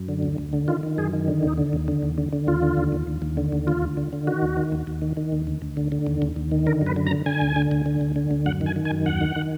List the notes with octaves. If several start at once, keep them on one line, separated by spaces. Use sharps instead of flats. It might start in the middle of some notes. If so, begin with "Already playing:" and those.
Already playing: F#2
D3
D2
D2
D3
D#3 F4
D#3
F#2 G#4
D#3
D3
D#2 D#4
D3
D#2
D3
D#2
D3
D3
D#2 F4
D3
D#2
D#2
D#2
D#2
D3
D#2
D2 F4
D2
D3
D3
D#3 F#4
D#2
D#3
D#2
D#2
D#3
D#3
D#2
D2
D2
D3
D3
D#2
D#2
D#2
D#3
D3 A#4
F#2
B4
D3
A#5
D3
D3 G#5
D2
D3
D2
D3
D2
D3
D2
F#2 F#5
D#3
G#5
D#3
G#5
F#2
D#2 F#5
D#3
D#3